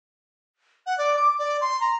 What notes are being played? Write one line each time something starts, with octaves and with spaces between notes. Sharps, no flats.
F#5
D5
D6
D5
C6
A#5